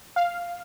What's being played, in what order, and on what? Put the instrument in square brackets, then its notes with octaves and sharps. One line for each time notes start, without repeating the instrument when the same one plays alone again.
[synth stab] F5